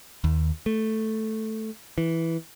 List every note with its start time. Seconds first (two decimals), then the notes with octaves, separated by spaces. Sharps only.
0.24 D#2
0.66 A3
1.98 E3